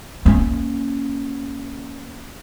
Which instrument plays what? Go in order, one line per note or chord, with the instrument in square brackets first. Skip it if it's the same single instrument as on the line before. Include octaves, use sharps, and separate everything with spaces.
[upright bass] A#3 C#4